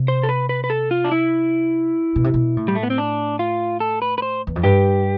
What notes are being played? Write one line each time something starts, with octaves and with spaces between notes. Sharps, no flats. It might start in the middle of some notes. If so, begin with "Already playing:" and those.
Already playing: C3
C5
A4
B4
B4
B4
A4
F4
D4
E4
B2
C3
B2
A2
G3
A3
B3
C4
D4
F4
A4
B4
B4
C5
E2
F2
G2 G4